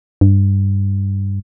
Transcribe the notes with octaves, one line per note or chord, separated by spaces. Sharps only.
G2